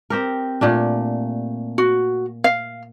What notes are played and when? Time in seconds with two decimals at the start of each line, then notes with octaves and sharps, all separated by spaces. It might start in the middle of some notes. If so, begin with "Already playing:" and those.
0.10 C4 G4 A#4
0.61 A#2 A3 D4
1.78 F#4
2.44 F5